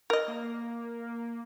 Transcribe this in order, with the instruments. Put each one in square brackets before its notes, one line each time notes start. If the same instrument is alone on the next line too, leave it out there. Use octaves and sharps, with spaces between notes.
[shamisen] A#4 D#5
[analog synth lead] A#3